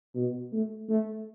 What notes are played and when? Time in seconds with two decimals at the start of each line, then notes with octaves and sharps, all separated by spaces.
0.15 B2
0.53 A3
0.89 A3